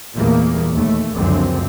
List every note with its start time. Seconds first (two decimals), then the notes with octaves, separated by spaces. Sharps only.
0.18 E2 A#2 G3 A3 A#3
0.72 D#2 A3
1.16 C#2 F#2 D3 F3 C4